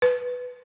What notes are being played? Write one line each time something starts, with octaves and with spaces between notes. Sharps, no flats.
B4